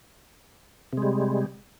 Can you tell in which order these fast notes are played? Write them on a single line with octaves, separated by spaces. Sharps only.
C3 G#3 G3